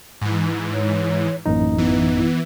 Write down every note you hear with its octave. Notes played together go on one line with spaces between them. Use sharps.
G#2 E3
C#5
A1 F#2 A#3 D#4
E3 B3